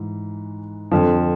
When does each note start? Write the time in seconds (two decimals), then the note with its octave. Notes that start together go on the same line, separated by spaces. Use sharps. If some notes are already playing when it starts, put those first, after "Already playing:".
Already playing: G#2 E3
0.91 F2 D3 F3